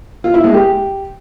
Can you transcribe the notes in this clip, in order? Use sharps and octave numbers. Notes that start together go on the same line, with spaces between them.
F4
E4
G#3
G4